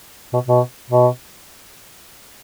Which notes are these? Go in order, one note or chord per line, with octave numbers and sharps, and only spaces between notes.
B2
B2
B2